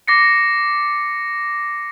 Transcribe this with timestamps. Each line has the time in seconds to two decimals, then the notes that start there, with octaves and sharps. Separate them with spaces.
0.08 D6 A6 A#6 C7 C#7